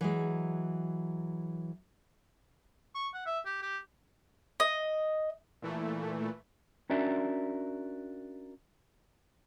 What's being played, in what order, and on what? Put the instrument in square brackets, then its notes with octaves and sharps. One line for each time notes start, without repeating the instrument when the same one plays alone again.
[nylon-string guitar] E3 F#3 G#3
[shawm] C#6
F#5
E5
G4
G4
[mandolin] D#5
[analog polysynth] A#2 E3 A3
[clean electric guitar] C#4 D4 F#4 A#4 D5 E5